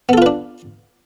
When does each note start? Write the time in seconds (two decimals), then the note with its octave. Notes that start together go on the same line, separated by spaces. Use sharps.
0.09 B3
0.13 A4
0.18 F4
0.22 B4
0.26 D4